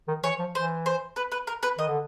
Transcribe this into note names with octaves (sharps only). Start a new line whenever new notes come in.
D#3
E3 C#5
F3
E3 C5
C5
B4
B4
A#4
B4
D#3 D#5
D3